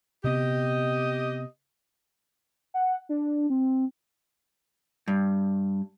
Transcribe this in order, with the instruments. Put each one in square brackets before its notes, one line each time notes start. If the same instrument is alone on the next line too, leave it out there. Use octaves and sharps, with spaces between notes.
[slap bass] C3 B3 [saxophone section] G4 D#5
[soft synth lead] F#5
D4
C4
[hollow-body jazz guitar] G2